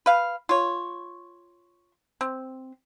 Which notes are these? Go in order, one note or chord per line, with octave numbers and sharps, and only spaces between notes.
B4 F5
F4 C#5
C4